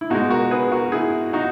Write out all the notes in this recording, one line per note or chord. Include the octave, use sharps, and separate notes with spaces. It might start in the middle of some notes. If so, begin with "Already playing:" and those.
E4
B2 G#3 D#4 F#4
F#4 A#4
G#4 B4
F#4 A#4
E4 G#4
D#4 F#4